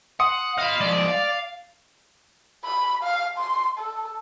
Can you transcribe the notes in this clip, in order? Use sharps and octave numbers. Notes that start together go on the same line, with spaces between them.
F#5 C6 D#6 C#7
D#5 F5 B5
F3 G#3 D5
F5
B5
F5
C6
A4